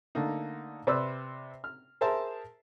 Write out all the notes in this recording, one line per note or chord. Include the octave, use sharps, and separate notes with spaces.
D3 A3 A#3 D#4
C3 B4 C5 D5 E6
F6
G#4 A#4 C5 E5 A5